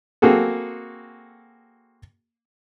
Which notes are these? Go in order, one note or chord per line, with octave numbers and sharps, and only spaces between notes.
A#3 C4 F#4 G#4 A4